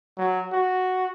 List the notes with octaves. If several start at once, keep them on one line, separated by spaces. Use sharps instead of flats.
F#3
F#4